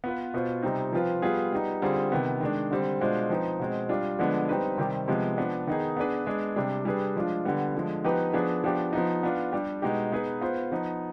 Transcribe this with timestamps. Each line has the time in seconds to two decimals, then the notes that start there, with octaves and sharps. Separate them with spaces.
0.04 B3 F4 B4
0.34 B2 B3 F4 C5
0.63 C3 G3 C4 D#4
0.93 F3 C4 F4 B4
1.22 G3 B3 F4 G#4
1.53 G3 B3 D#4
1.82 D3 G3 C4 F4 G#4
2.12 C3 D#3 B3
2.41 D#3 G#3 D4
2.71 D3 G3 C4
3.01 B2 G#3 D4 F4 C5
3.29 F3 C4 D#4 B4
3.60 B2 G#3 C4
3.89 G3 D4 F4
4.19 D3 F3 G#3 B3 D4
4.49 G3 C4 D#4 B4
4.78 C3 D#3 G3 C4 G4
5.08 C3 F3 G#3 B3
5.37 F3 B3 D4
5.67 D#3 B3 D#4 G#4
5.97 B3 D4 G#4 B4
6.26 G#3 B3 D4 G#4
6.56 C3 G3 D4
6.85 G3 D4 G#4 B4
7.16 F3 G#3 D4 F4
7.45 D3 G3 B3
7.75 D3 F3 G#3
8.04 F3 B3 D#4 G4 B4
8.33 F3 B3 D4 G#4
8.64 F3 B3 D4 G4
8.93 F3 B3 D#4
9.23 B3 D4 F4
9.53 G3 D4 G4
9.82 B2 G#3 B3 D#4 G4
10.12 B3 D#4 G#4 B4
10.41 B3 F4 C5
10.72 F3 B3 D#4